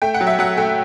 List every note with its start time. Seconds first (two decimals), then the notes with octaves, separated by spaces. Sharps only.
0.02 A3 G5
0.14 F#5
0.21 F#3
0.27 E5
0.39 F#3 F#5
0.57 A3 G5